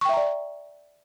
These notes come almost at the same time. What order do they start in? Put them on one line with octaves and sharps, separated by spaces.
C#6 G5 E5 A#5 D5